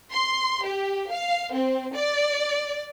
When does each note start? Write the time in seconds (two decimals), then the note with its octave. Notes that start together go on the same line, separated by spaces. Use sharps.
0.12 C6
0.65 G4
1.11 F5
1.54 C4
1.95 D5